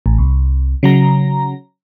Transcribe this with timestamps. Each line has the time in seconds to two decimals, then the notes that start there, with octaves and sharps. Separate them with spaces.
0.06 A1
0.18 C2
0.83 C#3 F#3 A#5